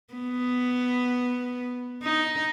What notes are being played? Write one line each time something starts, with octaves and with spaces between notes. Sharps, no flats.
B3
D#4